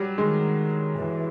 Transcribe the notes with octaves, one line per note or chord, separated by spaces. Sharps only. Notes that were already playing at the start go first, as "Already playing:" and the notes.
Already playing: F#3 G3
D#3 G#3
E3